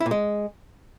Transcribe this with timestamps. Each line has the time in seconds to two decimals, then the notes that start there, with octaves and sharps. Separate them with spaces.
0.01 E4
0.06 A#2
0.11 G#3